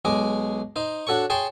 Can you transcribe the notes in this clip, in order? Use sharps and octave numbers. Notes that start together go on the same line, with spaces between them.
B1 G#3 G#4 D6
D#4 C5
D4 F#4 A4 C#5 C#6
G#4 C#5 G5 A5 C6